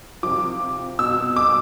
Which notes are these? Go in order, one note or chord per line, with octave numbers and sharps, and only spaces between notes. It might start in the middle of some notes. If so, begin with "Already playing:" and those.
C3 F3 D6
B2 E6
D6